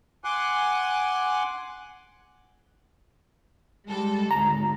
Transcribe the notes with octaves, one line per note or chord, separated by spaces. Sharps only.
F#5 G#5 C6 D6 F#6
G3 G#3 A4
G#1 D2 A#5